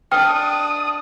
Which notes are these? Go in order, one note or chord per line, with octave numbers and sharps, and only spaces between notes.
D4 G5 D#6 F6